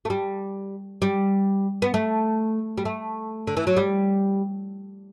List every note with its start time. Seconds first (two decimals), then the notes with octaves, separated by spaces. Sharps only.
0.05 A3
0.10 G3
1.02 G3
1.82 B3
1.94 A3
2.78 G3
2.85 A3
3.47 D3
3.57 E3
3.67 F#3
3.77 G3